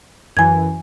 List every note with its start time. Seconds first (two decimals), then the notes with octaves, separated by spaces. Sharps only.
0.37 F#2 E3 G#5 G#6